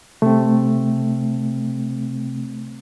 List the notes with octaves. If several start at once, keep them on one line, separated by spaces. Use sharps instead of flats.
C3 A3 C4